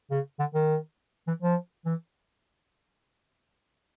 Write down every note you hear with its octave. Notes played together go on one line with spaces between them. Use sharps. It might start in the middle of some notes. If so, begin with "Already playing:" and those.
C#3
D3
D#3
E3
F3
E3